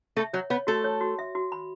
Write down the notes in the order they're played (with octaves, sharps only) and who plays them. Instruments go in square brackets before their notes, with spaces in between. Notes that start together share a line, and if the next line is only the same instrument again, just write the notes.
[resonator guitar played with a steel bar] A3 A4 [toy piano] E5
[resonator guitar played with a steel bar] F#3 F#4 [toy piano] C#5
[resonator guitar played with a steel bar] B3 B4 [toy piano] C#5
[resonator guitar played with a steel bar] A3 A4 [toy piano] F#4
[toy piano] C#5
F#4
E5
F#4
B5